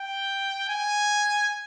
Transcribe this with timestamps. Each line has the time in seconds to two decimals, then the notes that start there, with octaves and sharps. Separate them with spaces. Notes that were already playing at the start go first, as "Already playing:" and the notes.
Already playing: G5
0.69 G#5